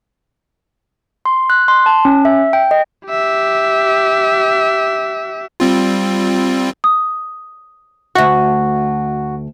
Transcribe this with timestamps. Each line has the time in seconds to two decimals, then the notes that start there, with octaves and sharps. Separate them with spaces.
1.25 C6
1.50 F#6
1.68 C6
1.86 A5
2.05 C#4
2.25 E5
2.53 G5
2.71 D#5
3.07 G4 E5
5.60 G3 C4 F4
6.84 D#6
8.15 D2 F#4 E5